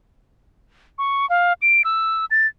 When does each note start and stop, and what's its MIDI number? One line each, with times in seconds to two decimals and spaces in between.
0.98 1.28 85
1.29 1.53 77
1.62 1.82 98
1.84 2.25 88
2.31 2.47 93